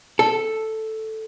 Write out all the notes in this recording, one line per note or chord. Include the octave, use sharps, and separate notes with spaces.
A4